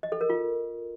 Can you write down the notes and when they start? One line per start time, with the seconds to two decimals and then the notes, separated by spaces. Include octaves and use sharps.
0.03 D#5
0.12 A4
0.21 A#4
0.29 F4